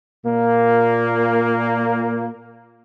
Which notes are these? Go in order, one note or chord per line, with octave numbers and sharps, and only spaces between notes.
A#2 A#3